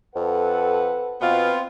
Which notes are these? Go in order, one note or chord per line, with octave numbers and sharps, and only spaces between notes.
F2 A4 B4 F#5
B2 B3 C4 F4